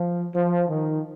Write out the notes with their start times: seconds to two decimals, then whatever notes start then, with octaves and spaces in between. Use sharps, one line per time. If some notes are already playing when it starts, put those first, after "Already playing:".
Already playing: F3
0.34 F3
0.68 D#3